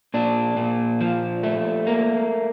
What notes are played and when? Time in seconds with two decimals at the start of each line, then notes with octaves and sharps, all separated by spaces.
0.14 A#2 D4
0.57 A#2
1.01 F3
1.43 A3
1.87 A#3